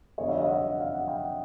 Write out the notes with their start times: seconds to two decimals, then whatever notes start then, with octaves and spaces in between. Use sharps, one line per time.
0.18 F2 D3 G3 B3 C#5 D#5
0.28 D5 E5
0.38 D#5 F5
0.48 E5 F#5
0.80 F5
0.94 F#5
1.08 F5 G5